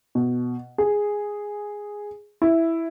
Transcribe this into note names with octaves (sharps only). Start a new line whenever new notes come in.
B2
G#4
E4